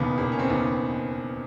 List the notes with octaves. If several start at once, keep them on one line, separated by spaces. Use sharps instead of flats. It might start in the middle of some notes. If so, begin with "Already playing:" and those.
Already playing: E1 D#2 C#3 A#3 B3
E1 A#3
C#4
C4
D#2 C#3 B3